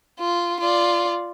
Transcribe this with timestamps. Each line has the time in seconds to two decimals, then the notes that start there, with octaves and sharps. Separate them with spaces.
0.19 F4
0.60 F4 D5